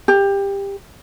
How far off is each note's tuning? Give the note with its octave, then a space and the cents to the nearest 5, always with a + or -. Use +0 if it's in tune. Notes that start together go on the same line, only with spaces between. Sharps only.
G4 +20